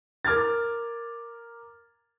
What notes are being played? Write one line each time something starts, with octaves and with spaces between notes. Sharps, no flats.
A#4 D6 F6 G#6 A6